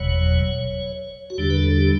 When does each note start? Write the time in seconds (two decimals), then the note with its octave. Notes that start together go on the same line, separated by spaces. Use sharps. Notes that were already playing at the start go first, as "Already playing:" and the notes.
Already playing: F#1 E2 B2 F#3 C#5
1.30 F#4
1.38 E2 D3 G3 D4 G4
1.50 B4
1.58 A4
1.76 G4